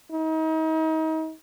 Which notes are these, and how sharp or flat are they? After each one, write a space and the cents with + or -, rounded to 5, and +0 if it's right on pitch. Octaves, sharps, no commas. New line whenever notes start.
D#4 +35